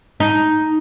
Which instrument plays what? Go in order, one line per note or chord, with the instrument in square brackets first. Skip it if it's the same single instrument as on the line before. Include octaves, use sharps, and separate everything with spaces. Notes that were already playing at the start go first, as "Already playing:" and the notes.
[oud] D#4